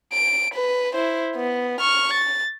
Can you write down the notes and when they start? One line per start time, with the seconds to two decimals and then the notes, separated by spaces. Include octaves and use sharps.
0.13 D7
0.54 B4
0.95 E4 C5
1.36 B3
1.81 C#6 F6
2.13 A6